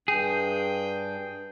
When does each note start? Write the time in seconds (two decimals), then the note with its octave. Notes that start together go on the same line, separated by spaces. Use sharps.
0.08 G2 G#4 G5